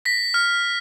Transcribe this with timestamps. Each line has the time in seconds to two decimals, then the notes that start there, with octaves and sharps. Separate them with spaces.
0.05 A#6 B6
0.34 F6